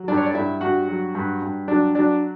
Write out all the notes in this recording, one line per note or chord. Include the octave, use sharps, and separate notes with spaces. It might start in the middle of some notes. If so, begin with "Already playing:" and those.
Already playing: F#3
G2 D4 D5
C#5
D5
G2 E4 E5
G2 F#4 F#5
F#3
G2
G2
F#3 D4 D5
F#3 D4 D5